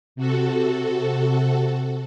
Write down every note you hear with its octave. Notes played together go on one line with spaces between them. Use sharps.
C3 F#4 A4